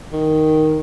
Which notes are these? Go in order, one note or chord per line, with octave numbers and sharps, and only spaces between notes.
D#3